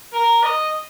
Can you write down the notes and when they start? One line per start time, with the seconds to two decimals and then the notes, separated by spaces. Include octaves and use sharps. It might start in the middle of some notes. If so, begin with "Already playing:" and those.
0.14 A#4
0.44 D#5